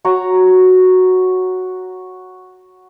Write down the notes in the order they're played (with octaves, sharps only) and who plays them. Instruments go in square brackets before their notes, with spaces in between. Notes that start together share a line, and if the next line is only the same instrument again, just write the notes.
[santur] F#4 C#5 A#5